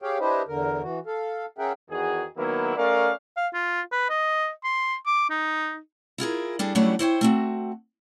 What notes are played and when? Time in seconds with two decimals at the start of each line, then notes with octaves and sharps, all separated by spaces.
0.02 G4 G#4 C#5 F5 G5
0.20 D4 E4 G4 B4 C5 D#5
0.48 E2 D3 A#4
0.82 E3 F#4
1.06 A4 F5
1.58 C#4 G#4 A#4 E5 F#5 G5
1.90 E2 D#3 F#4 G#4
2.37 D#3 F#3 A#3 B3 E4
2.77 A3 C#4 A#4 D5 F5
3.37 F5
3.54 F4
3.92 B4
4.10 D#5
4.64 C6
5.06 D6
5.30 D#4
6.18 E4 F4 G#4 A#4
6.59 G3 D4 G#4 A4
6.75 F#3 G3 A3 C#4 D4 E4
6.99 E4 C5 C#5 G5
7.21 A3 C4 F#4